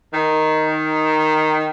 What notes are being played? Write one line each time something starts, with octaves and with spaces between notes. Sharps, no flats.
D#3